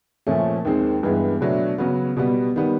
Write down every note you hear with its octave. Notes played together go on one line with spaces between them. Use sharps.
A#2 F3 A3 C#4
D#2 D#3 G#3 C4
G2 E3 G#3 B3
B2 F#3 A3 D4
C#3 F#3 B3
B2 G3 B3
D#3 G3 B3